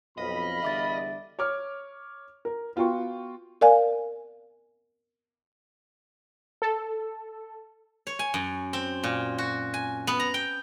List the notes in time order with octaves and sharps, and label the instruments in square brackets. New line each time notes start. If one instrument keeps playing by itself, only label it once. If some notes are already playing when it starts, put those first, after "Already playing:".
[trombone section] B1 F2 [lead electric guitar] D#5 [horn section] F5 B5
[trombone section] E2 D3 G3 [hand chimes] E5 D6 A6
[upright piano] C#5 D6 F6
A#4
B3 F4 F#4 G5 C6 C#6
[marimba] A#4 D5 F5 G#5
[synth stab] A4
[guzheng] C#5
G#5
F#2
C4
A#2
F#4
G#5
B3
A#5
G5